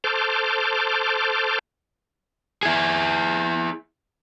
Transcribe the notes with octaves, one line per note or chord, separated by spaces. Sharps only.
A4 C5 A5 D6 F6 G6
E4 G#4